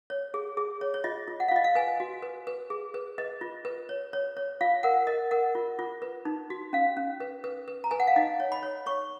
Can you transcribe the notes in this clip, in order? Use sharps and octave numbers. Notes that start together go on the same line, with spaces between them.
C#5
G#4
G#4
C#5
C#5
F4 D#5
F4
F#5
F5
F4 D#5
F5
B4 G#5
F#4
B4
B4
G#4
B4
B4 D#5
F4
B4
C#5
C#5
C#5
F4 F5
A#4 F#5
A#4 D#5
A#4 F#5
F4
F4
B4
D#4
F#4
C#4 F5
C#4
B4
B4
B4
A#5
B4 G#5
F#5
F5
D#4 D#5
C#5
B5
C#5
C#5 C#6